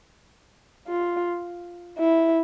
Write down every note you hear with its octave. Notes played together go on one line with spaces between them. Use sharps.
F4
E4